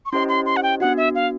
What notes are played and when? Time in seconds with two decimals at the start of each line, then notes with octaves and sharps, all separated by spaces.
0.06 C#6
0.12 C#4 E4 G4 C5 D#5 C6
0.29 C6
0.46 C6
0.57 F#5
0.63 G5
0.80 B3 D4 F#4 F#5
0.97 E5
1.15 F5